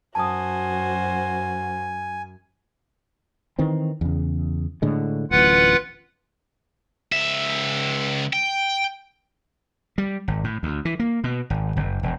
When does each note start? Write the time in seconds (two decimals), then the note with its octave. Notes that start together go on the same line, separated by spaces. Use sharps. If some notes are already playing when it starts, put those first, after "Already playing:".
0.15 F#2 F#4 C5 G#5 A5 D#6
3.59 D#3 E3 C4
4.01 E2 C#3
4.82 A2 D3 G#3
5.31 D1 A1 F4 B4 F#5
7.12 C#2 E5
8.33 G5
9.98 G3
10.28 G#1
10.44 A2
10.63 D2
10.85 E3
10.99 A#3
11.24 B2
11.50 G#1
11.76 F#1
12.03 E1